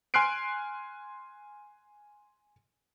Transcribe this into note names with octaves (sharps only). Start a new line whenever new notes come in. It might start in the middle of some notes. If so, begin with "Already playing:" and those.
G#5 C6 F6 F#6 C7 D7